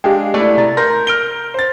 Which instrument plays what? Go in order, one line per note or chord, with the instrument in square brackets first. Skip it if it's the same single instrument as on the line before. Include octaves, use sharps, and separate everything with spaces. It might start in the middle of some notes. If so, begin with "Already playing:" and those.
[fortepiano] G#3 D4 [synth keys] G4 F5 G5
[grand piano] A3 E4 [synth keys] D5
[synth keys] C3 A#5 A6
[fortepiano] A#4 [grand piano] C6 A#6 [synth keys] G6
[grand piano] F6 D7 G7
C5 A6